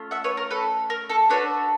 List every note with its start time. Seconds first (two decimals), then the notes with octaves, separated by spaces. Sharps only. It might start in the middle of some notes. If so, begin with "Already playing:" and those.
Already playing: A3 C#4 F4
0.11 E5 F#5
0.24 B4 C#5
0.37 A#4
0.50 A4 B4
0.90 A#4
1.09 A4
1.29 D4 F#4 A4 B4 C#5